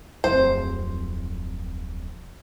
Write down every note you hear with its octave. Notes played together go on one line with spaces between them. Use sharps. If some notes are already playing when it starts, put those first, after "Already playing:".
D1 F2 C5